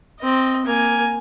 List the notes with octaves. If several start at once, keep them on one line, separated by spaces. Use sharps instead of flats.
C4 D#5
A#3 G#5